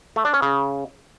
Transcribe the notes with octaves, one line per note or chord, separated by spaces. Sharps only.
A3
D4
C#4
C#3